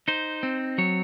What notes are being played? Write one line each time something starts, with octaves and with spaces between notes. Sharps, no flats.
D#4 C5
C4
F#3 C#5